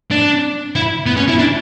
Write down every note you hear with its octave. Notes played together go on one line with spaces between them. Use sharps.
D4
E4
B3
C#4
E4
D4